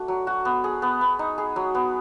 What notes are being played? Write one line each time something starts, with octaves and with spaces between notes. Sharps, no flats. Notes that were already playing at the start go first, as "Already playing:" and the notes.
Already playing: A3 D4 F#4
F#3
F#4
B3
G#4
B3
B3
D#4
G#4
F#3
B3